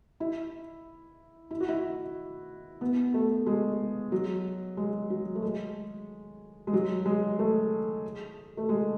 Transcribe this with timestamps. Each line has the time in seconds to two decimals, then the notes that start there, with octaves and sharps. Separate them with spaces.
0.20 E4
1.51 E4
1.60 F#4
1.69 E4
2.81 B3
3.14 A3
3.46 G#3
4.12 F#3
4.77 G#3
5.10 F#3
5.35 A3
5.42 G#3
6.67 G#3
6.73 F#3
7.06 G#3
7.39 A3
8.57 A3
8.69 G#3